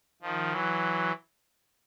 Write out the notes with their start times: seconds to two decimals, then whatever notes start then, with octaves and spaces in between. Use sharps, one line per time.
0.22 D#3 F3
0.51 E3 F#3